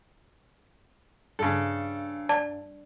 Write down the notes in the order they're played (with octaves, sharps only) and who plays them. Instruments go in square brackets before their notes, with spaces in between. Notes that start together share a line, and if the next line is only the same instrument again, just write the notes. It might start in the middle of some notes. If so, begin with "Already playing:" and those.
[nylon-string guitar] G2 [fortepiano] C#3 A4
[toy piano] D5 [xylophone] A5